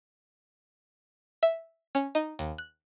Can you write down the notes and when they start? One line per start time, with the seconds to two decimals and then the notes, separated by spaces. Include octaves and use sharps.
1.43 E5
1.95 C#4
2.15 D#4
2.39 D#2
2.58 F#6